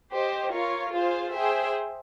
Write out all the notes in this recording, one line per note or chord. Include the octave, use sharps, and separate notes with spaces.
G4 C5 D#5
F4 A#4 C#5 F5
F4 G#4 C5 F5
G#4 C5 E5 G5